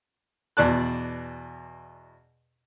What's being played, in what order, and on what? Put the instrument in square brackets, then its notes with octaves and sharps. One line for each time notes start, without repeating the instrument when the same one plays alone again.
[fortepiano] E2 B2 D5 A5 F#6